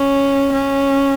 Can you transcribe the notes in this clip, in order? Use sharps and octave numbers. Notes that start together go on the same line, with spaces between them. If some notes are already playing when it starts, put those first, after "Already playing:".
Already playing: C#4
C#4